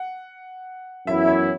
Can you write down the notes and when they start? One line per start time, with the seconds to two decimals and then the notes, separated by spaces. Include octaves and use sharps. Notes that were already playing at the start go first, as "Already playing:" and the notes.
Already playing: F#5
1.06 F#2 E3 B3 E4 E5
1.27 C#5